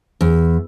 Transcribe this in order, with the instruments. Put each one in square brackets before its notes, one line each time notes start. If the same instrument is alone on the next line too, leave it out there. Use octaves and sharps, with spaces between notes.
[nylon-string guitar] E2